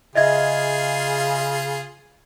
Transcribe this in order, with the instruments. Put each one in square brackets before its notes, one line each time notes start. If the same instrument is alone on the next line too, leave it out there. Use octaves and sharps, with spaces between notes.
[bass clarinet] C#3 [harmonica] F4 G#4 [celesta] D#5 E5 G#6